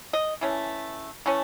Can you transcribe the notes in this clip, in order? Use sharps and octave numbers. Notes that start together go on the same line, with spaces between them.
D#5
E3 A3 C#4
E3 A3 C#4